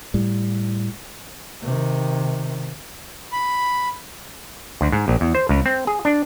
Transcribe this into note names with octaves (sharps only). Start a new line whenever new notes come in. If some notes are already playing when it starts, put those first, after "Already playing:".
A2 G3
C3 D#3
B5
D2
G#2
A#1
E2
C5
C#2
C4
G#4
D4